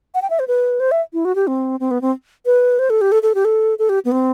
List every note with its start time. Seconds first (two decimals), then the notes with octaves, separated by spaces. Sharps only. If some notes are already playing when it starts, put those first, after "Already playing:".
0.15 F#5
0.22 G5
0.30 E5
0.39 C5
0.48 B4
0.80 C5
0.91 E5
1.13 E4
1.25 F#4
1.35 G4
1.47 C4
1.80 C4
1.91 B3
2.01 C4
2.46 B4
2.79 C5
2.90 A4
3.01 G4
3.12 A4
3.23 A4
3.35 G4
3.45 A4
3.79 A4
3.89 G4
4.05 B3
4.12 C4